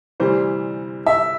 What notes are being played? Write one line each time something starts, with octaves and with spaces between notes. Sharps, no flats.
D2 C3 E3 G3 C5
E5